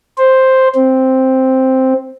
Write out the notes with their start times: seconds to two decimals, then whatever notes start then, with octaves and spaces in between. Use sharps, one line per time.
0.18 C5
0.75 C4